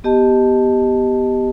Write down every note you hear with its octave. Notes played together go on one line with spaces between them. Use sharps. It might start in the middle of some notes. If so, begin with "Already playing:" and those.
B3 G4 D#5 A5